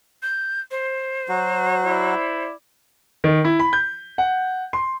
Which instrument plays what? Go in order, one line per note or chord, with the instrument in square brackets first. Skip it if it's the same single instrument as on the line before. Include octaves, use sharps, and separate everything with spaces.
[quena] G6
C5
[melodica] F#3 F#4
[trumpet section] E4 D5
[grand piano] D#3
E4
B5
G6
F#5
C6